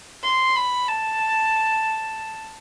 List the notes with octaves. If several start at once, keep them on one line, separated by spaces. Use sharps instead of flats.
C6
B5
A5